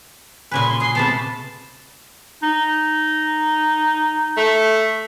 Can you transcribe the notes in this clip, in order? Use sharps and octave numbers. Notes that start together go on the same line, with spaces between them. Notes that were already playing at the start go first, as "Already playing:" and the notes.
A#2 C#3 B4 G#5
C6
G#4 C7
C3 A3 B3 A5
D#4
A3